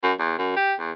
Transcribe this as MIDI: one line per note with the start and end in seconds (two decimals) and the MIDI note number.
0.03 0.13 42
0.19 0.36 40
0.38 0.55 42
0.56 0.74 67
0.80 0.91 40